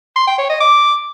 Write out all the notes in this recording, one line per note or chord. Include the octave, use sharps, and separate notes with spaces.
C6
G5
C#5
D#5
D6